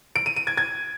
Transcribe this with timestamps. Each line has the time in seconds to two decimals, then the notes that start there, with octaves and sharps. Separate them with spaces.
0.16 D7
0.26 D#7
0.36 D#7
0.47 G#6
0.57 G#6